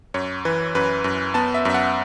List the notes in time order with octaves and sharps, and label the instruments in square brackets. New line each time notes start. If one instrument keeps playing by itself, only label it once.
[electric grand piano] F#2 C#5
E3 B4
F#2 B4
F#2
B3 A5
E5
F#2 E5
F#5